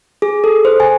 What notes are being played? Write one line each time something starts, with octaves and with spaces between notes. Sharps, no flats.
G#4
A4
C5
G#5